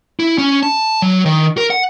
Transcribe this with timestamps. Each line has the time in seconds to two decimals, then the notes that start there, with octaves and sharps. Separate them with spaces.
0.20 E4
0.38 C#4
0.63 A5
1.02 F#3
1.26 D#3
1.58 A#4
1.70 F#5